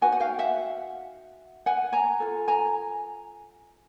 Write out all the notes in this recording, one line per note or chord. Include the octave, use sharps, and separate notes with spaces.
D#4 F#4 B4 F#5 G#5
F#5
F5 G5
E5 F#5
F#5 G#5
G#5 A#5
F4 A4
G#5 A#5